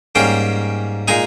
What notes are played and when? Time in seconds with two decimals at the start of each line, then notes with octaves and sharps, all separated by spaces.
0.15 G#2 G3 A#3 C#4 G5
1.08 A#2 G#3 D#4 G#5